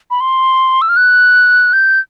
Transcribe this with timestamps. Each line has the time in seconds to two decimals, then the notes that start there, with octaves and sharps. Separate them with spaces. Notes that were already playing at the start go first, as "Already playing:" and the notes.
0.11 B5
0.21 C6
0.82 E6
0.89 F6
0.97 F#6
1.73 G6